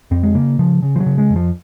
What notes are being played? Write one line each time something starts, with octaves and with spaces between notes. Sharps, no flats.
F2 C4
G#3
C#3 A#3
C#3 F3
C#3
F3
F#3
C#3
G#3
F2
F3